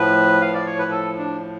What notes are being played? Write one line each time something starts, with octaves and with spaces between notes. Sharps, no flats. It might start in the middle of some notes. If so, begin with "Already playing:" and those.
Already playing: A2 F3 B4
F5
D5
C#5
B4
A4
D4